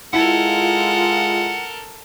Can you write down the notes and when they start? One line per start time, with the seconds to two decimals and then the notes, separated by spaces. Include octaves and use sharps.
0.13 G#3 E4 F4 A4 A#4 F#5